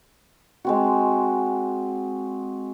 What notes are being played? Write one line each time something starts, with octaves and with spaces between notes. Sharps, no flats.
G#3 C4 F#4